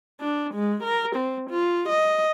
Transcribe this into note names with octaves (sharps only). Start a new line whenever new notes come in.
D4
G#3
A#4
C4
F4
D#5